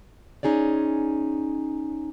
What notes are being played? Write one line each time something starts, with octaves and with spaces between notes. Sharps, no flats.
C#4 D#4 G#4 C#5 D5